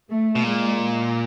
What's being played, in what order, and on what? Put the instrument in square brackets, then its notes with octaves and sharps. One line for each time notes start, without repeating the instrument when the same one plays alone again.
[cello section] A3
[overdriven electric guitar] B2
[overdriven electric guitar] A#2 [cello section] G#3